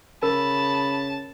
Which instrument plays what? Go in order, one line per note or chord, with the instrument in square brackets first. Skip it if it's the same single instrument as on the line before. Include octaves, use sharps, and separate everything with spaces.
[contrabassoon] C#3 [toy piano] A#4 [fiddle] A5 [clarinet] B5